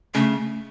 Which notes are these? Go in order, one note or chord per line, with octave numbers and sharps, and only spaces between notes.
C#3 A3